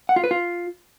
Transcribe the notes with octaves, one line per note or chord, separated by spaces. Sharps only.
F#5
F4
B4
F4